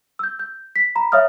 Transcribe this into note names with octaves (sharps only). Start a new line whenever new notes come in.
E6 G6
G6
B6
A#5 B5
C#5 E5 F5 D#6 F6